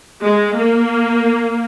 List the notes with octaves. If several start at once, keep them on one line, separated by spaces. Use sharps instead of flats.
G#3
A#3